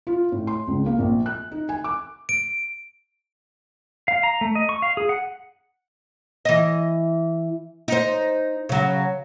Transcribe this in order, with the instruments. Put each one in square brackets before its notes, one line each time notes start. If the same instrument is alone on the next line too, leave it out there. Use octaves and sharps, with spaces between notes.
[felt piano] F4
A2
C6
C#2
A#3
A#1
F#6
D#4
G#5
D6
[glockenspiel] D7
[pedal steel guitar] F5
A#5
A3
D#5
C#6
F5
G#4
F#5
[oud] E3 D#5
D#4 C5
C#3 F#3